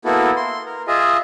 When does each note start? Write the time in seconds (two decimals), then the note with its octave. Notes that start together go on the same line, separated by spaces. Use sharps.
0.05 A#3 B3 E4 F#4 A4
0.37 C6
0.66 A#4
0.87 F4 G#4 D#5 E5